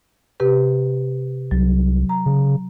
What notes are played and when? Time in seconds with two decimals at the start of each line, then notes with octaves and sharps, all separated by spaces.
0.40 C3 G4 B4
1.51 C2 F#3
2.09 A#5
2.26 C#3